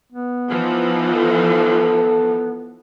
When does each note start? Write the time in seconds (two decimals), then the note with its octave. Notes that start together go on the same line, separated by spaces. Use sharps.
0.12 B3
0.50 E3 F3 D#4
1.15 A4